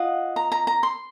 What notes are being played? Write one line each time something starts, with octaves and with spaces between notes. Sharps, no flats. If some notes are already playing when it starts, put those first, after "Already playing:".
Already playing: F4 D#5 F#5
A#5
A#5
A#5
C6